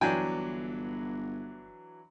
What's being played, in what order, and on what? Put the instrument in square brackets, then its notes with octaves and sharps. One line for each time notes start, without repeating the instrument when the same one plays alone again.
[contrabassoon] G1 [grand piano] E3 F#3 D4 [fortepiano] G5 G#5